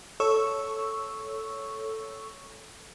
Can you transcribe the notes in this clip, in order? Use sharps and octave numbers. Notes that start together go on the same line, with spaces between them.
A4 C#5 C#6 E6